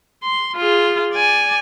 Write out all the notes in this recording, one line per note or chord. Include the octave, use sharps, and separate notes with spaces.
C6
F4 G#4
D5 G#5